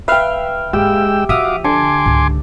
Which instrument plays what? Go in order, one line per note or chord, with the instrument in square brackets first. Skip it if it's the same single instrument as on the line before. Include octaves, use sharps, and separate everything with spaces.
[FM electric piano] B4 F5 F6 [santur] E5 G5
[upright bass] G#2 A#3 [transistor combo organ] G#3 G5 E6 [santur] G4
[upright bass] F3 F4 [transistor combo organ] F#4 F5 D6 [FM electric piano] E5 D#6 F6
[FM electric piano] D3 [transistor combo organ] G#5 C6 D6 [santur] A5
[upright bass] C#2 G#2